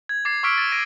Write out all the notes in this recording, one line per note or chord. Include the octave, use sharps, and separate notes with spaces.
G#6
D6 G#6 A6 C7
C#6 D6 E6 F6 B6 D7
A6
G#6 A#6 D7 D#7